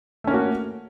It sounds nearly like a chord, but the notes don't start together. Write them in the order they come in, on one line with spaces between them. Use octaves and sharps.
A3 C#4 A#3 F#4